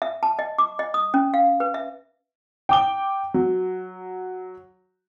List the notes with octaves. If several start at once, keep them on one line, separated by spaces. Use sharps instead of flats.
E5
A5
D#5
D6
D#5
D#6
C#4
F5
B4
E5
G5 D6 G7
F#3